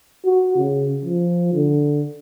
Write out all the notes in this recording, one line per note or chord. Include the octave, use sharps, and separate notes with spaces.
F#4
C#3
F3
D3